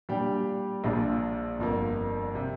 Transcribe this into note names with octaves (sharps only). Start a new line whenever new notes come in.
A#2 G3 D4 G4
A#1 A#2 F3 D4 F4
G1 F2 F3 A#3
C3